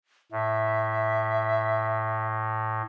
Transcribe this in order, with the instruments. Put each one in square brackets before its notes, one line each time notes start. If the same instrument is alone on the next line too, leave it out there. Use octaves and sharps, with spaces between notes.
[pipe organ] A2 [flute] E5